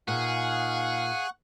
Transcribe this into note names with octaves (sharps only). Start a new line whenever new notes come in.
A#2 D#4 G#4 F5 F#5 C#6 F#6